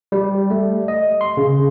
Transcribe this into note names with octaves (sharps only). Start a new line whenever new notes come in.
G3
A3
D#5
C6
C#3